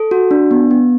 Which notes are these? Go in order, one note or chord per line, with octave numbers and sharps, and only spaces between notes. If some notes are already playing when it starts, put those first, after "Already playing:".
Already playing: A4
F#4
D4
B3
B3